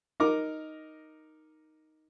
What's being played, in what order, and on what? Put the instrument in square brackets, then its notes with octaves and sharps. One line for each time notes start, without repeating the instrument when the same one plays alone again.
[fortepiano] D#4 A#4 D6